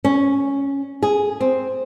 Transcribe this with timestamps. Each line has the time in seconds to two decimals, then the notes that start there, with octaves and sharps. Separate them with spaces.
0.04 C#4
1.03 G#4
1.41 C4